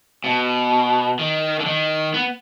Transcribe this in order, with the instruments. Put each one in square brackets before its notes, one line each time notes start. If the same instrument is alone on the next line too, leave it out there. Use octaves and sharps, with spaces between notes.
[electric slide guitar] B2
D#3
D3
D#3
B3